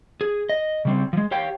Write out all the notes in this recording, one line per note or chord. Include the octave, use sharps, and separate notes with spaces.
G#4
D#5
C#3 G3 C4
F3 G#3
G4 C#5 F5 G5